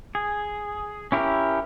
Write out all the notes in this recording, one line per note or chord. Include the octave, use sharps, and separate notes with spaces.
G#4
C#4 E4 G4 A#4